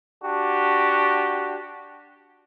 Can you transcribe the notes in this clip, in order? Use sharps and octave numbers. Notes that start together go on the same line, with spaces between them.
D4 F#4 G4